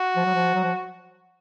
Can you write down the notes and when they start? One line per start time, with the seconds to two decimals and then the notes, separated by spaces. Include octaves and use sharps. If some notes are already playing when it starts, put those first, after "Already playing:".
Already playing: F#4
0.16 F3
0.26 F#3
0.34 F3
0.55 F#3
0.64 F3